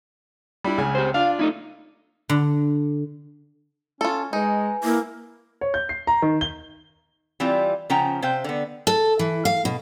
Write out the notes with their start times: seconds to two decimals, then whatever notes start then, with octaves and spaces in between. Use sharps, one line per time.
0.64 G3 D4 E4
0.78 C#2 C#3 G#5
0.95 G4 C5
1.14 D4 F4 F5
1.39 A3 D#4 E4
2.29 D3
4.01 C#4 F4 A4
4.33 G#3 D#4 B4 G#5
4.84 A#3 E4
5.61 C#5
5.74 G6
5.89 C7
6.07 A#5
6.22 D#3
6.41 G7
7.40 E3 G3 C4 E4 F4
7.90 C#3 F3 C#4 F#5 G5 A#5
8.22 C3 C5 F5 G5
8.44 D3 B3
8.87 A4
9.19 E3
9.45 F5
9.65 B2